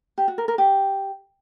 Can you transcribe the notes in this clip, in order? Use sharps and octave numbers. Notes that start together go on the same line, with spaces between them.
G4
F#4
A#4
A#4
G4